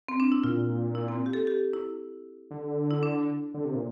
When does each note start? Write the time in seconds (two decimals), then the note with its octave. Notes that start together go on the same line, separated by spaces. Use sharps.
0.09 C4
0.20 D4
0.32 E4
0.44 A#2 F4
0.95 E4
1.08 C4
1.26 G4
1.33 A4
1.47 G4
1.73 E4
2.51 D3
2.91 E4
3.03 D4
3.54 D3
3.65 C3
3.74 A#2